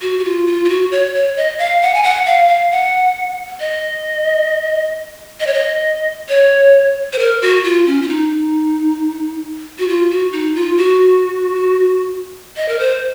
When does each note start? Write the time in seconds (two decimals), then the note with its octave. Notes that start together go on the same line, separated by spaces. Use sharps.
0.02 F#4
0.19 F#4
0.25 F4
0.47 F4
0.65 F4
0.69 F#4
0.91 C#5
1.14 C#5
1.37 D#5
1.59 F5
1.82 F#5
1.94 G#5
2.03 F#5
2.26 F5
2.48 F5
2.71 F#5
3.60 D#5
5.40 D#5
5.47 C#5
5.54 D#5
6.29 C#5
7.13 C5
7.19 A#4
7.42 F#4
7.64 F4
7.87 C#4
8.02 F4
8.08 D#4
9.79 F#4
9.88 F4
10.11 F#4
10.32 D#4
10.55 F4
10.77 F#4
12.57 D#5
12.68 A#4
12.79 C5